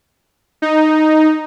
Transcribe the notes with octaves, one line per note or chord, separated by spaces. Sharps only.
D#4